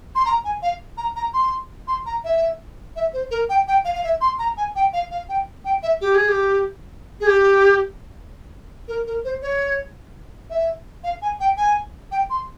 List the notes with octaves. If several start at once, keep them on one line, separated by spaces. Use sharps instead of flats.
C6
A#5
G#5
F5
A#5
A#5
C6
C6
A#5
E5
E5
C5
A#4
G5
G5
F5
F5
E5
C6
A#5
G#5
G5
F5
F5
G5
G5
E5
G4
G#4
G4
G#4
G4
A#4
A#4
C5
C#5
E5
F5
G#5
G5
G#5
G5
C6